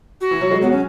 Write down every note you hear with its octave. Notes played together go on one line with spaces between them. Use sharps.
F#4
E3
F#3
G#3
F#3 B3
C#4